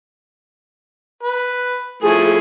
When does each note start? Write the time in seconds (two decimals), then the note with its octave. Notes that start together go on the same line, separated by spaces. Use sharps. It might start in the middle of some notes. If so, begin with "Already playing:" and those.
1.23 B4
2.03 F3 A3 E4 G#4